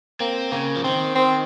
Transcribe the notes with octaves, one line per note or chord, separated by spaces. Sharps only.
A#3 C4
C#3 A#3
F3
D#3 C4
C4